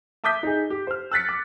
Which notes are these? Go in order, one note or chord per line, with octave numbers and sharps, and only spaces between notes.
E5 A5 D6 D#6 G6 B6
D#4 G#4
G4
C5 F6
E6 F#6 A6 B6 C#7
D6